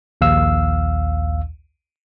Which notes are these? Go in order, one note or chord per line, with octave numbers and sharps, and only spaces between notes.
A#1 D#2 F5 E6